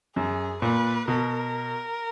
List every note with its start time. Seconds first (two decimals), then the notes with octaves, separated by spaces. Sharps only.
0.16 F#2 G#4
0.61 A#2 B4
1.07 B2 A#4